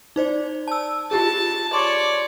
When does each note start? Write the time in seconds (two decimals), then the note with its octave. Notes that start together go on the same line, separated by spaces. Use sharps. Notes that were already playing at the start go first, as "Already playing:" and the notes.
0.16 D#4 C5 D5
0.68 A5 E6
1.11 F4 G4 G#4 A5
1.73 C#5 D5 C6 D6